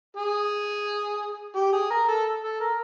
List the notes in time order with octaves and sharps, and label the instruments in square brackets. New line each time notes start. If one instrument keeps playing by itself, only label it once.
[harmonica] G#4
G4
G#4
A#4
A4
A4
A#4